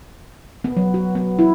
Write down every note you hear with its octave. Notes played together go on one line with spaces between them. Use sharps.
B3
F#3
F#4
B3
E4